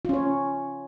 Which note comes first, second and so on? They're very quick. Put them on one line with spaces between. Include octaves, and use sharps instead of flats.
F4 C#4 C#5